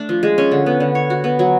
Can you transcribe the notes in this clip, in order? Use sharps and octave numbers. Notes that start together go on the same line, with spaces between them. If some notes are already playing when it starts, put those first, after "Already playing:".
Already playing: A3 D4
F3
G#3
C#4
D3
B3
D3
C#5
F#4
B3
F#3